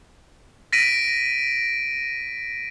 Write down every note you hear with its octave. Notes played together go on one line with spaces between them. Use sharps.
A#6 B6 D7 D#7